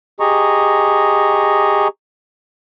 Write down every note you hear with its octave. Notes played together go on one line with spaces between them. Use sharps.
G4 G#4 D#5 A#5 C#6